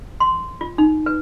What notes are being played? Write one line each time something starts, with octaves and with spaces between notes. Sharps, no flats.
C6
F4
D#4
B4